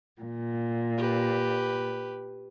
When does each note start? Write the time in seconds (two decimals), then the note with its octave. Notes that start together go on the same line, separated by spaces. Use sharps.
0.22 A#2
0.97 G4 B4